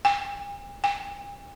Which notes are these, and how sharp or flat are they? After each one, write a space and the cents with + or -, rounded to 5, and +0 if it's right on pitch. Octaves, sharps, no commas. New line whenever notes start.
G#5 -45
G#5 -45